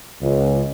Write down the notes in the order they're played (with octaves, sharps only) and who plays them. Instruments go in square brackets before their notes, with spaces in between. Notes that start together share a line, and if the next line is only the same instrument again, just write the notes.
[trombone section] C#2